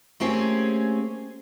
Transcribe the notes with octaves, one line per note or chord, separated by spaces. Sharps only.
A3 A#3 C4 C#4 G4 G#4